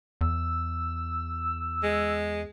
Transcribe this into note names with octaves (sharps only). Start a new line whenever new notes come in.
E2 E6
G#3